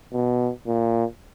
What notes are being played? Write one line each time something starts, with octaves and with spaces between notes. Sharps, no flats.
B2
A#2